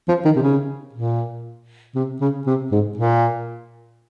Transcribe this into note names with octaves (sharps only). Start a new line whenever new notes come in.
F3
D#3
C3
C#3
A#2
C3
C#3
C3
G#2
A#2